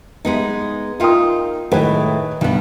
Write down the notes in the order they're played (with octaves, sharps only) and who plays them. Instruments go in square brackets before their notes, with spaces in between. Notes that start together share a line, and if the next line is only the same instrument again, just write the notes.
[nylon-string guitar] G#3 B3 D#4
[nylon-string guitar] D#4 F4 [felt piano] A#4 G5 D#6
[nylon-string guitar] A2 G#3 [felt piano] D#3 B4
[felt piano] B1 [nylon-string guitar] G2 B3